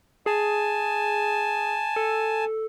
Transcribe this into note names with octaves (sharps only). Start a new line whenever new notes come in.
G#4 G#5 A5
A4